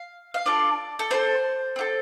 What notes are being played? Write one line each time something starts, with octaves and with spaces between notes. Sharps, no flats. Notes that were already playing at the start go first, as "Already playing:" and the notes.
Already playing: F5
F5
D4 F4 A4 D5
A4
C4 A4 C5
C4 F4 A4